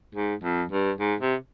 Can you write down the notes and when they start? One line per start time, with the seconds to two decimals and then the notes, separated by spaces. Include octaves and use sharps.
0.15 G#2
0.43 F2
0.71 G2
1.00 G#2
1.20 C3